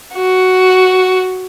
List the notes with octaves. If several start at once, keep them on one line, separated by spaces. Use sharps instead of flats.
F#4